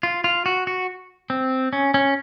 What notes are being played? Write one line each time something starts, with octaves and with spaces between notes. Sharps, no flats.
F4
F4
F#4
F#4
C4
C#4
C#4